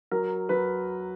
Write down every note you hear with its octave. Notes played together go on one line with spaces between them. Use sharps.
F#3 A#4
F#3 B4